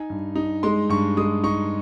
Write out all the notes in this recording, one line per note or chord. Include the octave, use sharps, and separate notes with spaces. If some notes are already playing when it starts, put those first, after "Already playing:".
Already playing: D#4 G#5
G2
D#4
G#3 C6
G2 C#6
G#3 D#6
D#4 C#6